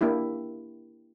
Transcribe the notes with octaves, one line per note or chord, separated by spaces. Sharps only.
A#3 D4 E4 G4